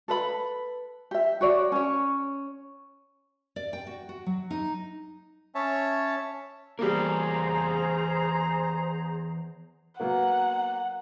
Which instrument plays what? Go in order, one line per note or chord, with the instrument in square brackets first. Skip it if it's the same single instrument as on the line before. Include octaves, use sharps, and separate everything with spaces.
[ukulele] A4 B4 B5
G4 E5
F#4 C#5 D5
C#4 C#5
[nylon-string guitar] D5
G5
F#4
F#4
F#3
D#4
[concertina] C#4 C#5 E5 A5
[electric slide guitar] E3 B3 A#4 [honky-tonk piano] G3 A#3 [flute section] G#4 C5 A#5
[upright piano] F#3 A#3 B3 [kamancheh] F#5